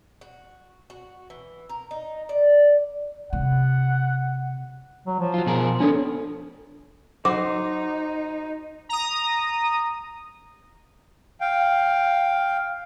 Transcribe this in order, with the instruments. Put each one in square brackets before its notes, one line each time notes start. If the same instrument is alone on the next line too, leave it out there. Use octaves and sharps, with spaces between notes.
[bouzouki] F#4
F#4
E3
A#4
D#4
D5
[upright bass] C3 [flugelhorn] F#5
[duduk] F#3
F3
[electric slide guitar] F#3 F4
B2 G#4 A#4
[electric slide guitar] B3 A#4 C#5 [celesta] D4 A4
[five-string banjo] F#3 [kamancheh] D#4 [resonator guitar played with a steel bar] C5 [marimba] D6
[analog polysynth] A#5 D#6
[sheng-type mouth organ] F5 G5